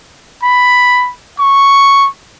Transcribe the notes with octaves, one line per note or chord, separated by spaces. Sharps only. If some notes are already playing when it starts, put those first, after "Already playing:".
B5
C#6